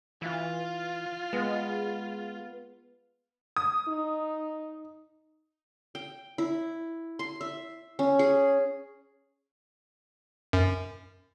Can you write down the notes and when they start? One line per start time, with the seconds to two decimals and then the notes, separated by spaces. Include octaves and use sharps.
0.22 E3 F4
1.33 G#3 B3
3.56 D#6
3.88 D#4
5.95 G5
6.38 E4
7.19 C6
7.41 E5
7.99 C#4
8.19 G#4
10.53 F#2